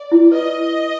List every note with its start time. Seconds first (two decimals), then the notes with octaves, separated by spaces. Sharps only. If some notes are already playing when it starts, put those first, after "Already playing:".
Already playing: D5
0.12 E4
0.32 B4 D#5